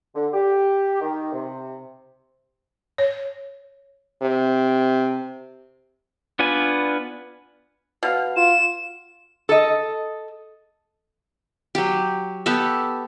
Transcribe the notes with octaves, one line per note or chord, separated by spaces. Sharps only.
D3
G4
D#3
C3
C#5
C3
B3 D4 F4 B4 G#5
B2 F5
F4 E7
A4 D#5
F#3 G4
B3 G4 A4 E5